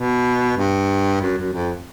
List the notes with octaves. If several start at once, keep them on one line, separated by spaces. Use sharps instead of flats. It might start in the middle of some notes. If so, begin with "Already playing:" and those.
Already playing: B2
G2
F#2
F#2
F2